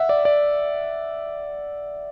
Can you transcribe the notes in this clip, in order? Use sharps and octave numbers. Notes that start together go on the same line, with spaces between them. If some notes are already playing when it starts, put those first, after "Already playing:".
Already playing: E5 F#5
D5
D5